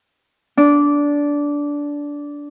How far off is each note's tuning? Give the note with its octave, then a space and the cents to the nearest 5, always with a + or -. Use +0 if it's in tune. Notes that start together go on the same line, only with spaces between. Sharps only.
D4 -15